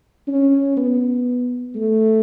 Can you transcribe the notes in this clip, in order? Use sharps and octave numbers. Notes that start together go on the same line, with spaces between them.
C#4
B3
A3